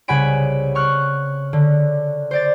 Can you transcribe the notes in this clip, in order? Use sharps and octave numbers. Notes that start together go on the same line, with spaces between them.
C2 C#3 F#5 G#5 B5 D7
C#6 F6 F#6
D3
C5 D5 A6